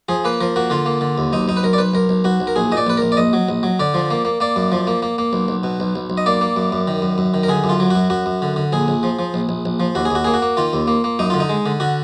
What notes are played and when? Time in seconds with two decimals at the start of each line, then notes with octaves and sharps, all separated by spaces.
0.09 F3 G#4
0.24 A#3 B4
0.41 F3 A#4
0.56 A#3 F#4
0.70 D3 F4
0.86 A#3
1.01 D3
1.18 D#2
1.33 B1 D#4
1.48 B1 D#4
1.57 B4
1.63 B1 A#4
1.73 D5
1.78 B1 B4
1.94 B1 A#4
2.09 B1
2.24 B1 F#4
2.40 B1
2.47 A#4
2.56 A#1 G#4
2.72 A#2 D#5
2.77 D5
2.87 A#1 B4
2.97 A#1 A#4
3.12 D5
3.17 A#1 D#5
3.33 F#3
3.49 A#1
3.63 F#3
3.79 D3 D5
3.94 F3
4.11 A#3
4.25 A#3
4.40 A#3 D5
4.56 F#2
4.72 F3
4.87 A#3
5.02 A#3
5.18 A#3
5.33 B1
5.48 B1
5.63 B2
5.80 B1
5.95 B1
6.10 B1
6.17 D#5
6.26 A#3 D5
6.41 A#3
6.56 F#2
6.72 F#2
6.87 D#3
7.02 F#2
7.18 F#2
7.34 D#3
7.43 A#4
7.49 D3 G#4
7.64 F#2
7.69 F4
7.80 F#3
7.90 F#2 F#4
8.10 F#2 F#4
8.26 F#2
8.42 D3
8.56 D3
8.72 A#1 G#4
8.88 A#1
9.03 F3
9.19 F3
9.34 A#1
9.49 A#1
9.65 A#1
9.80 F3
9.95 D#2 F#4
10.05 G#4
10.10 D#2 F#4
10.24 A#3 G#4
10.34 F#4
10.42 A#3
10.57 D#3 F4
10.73 D#2
10.88 A#3
11.04 A#3
11.19 F#2 D#4
11.30 D3 F4
11.40 D#4
11.49 G#3
11.66 D3
11.80 D3 F#4